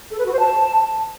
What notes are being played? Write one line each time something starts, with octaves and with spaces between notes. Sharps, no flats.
A4
B4
F#4
C5
A5